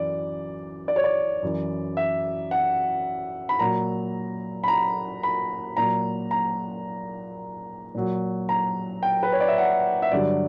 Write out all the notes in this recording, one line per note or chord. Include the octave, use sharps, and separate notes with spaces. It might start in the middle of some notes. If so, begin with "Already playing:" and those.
Already playing: F#2 E3 D5
D5
C#5
D5
F#2 E3
E5
F#5
B5
A#2 F#3 A#5
B5
A#5
B5
A#2 F#3 A#5
A#5
A#2 F#3
A#5
G5
B4
C#5
D5
E5
F#5
E5
G2 D3 F#3 D5